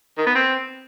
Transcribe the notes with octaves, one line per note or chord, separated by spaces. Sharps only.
D#3
B3
C4